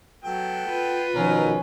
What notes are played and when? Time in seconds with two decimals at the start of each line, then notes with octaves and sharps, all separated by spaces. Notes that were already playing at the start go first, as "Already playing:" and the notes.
0.24 F#3 B3 A4 G5
0.69 F4 B4
1.15 B2 D#3 F3 F#3 C#4 A#4